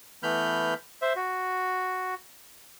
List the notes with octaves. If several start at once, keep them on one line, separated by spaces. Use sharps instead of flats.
E3 A3 B3 B5 F6 G6
C5 E5
F#4